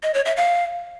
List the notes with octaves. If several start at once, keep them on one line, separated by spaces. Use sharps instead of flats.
D#5
C#5
E5
F5